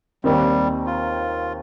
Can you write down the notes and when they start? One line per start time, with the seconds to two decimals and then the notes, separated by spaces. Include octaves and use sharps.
0.24 D#2 D#3 G3 C4
0.87 F4